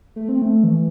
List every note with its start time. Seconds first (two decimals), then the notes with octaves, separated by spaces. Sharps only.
0.16 A3
0.29 C4
0.42 A3
0.64 E3